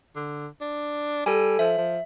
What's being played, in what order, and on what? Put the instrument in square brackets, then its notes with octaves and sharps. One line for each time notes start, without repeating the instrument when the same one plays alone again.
[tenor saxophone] D3
D4
[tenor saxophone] G3 [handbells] A4 G#5
[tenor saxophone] F3 [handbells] E5
[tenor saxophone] F3